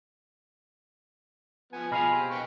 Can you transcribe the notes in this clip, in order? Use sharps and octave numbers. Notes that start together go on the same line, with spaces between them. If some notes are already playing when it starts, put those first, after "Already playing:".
F3 B3 G#5
B2 F3 G#4 D#5 F5 B5 F6
G4 C5
B4 G5 C#6